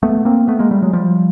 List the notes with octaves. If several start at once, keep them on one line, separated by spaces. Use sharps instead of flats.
A3 B3
A#3 C4
A3 B3
G#3 A#3
G3 A3
F#3 G#3
F3 G3